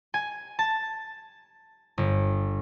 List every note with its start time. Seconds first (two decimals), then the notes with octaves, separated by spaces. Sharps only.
0.14 G#5
0.59 A5
1.98 G1